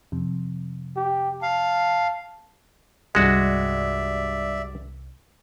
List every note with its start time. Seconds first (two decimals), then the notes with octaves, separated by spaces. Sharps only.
0.12 F2 C3
0.97 G4
1.42 F5 A5
3.15 C2 G2 G#3 F#4 D5 E5